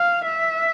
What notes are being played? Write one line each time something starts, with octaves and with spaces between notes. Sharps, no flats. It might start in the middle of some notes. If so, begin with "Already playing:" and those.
Already playing: F5
E5